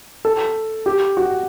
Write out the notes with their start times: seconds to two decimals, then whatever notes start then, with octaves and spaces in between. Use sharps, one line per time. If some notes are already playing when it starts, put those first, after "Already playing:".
0.25 A4
0.86 G4
1.17 F#4